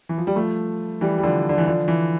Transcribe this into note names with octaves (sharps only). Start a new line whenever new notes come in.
E3
F3
G3
F3 A3
E3 G3
G3
D3 F3
D3
E3
D3 F3
E3